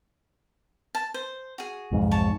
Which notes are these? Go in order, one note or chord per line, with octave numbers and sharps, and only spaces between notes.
A5
C5
F#4 G#4
B1 F2 G#2
C#5 A5 C#6